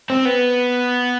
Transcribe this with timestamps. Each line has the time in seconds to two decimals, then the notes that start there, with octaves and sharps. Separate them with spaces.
0.10 C4
0.25 B3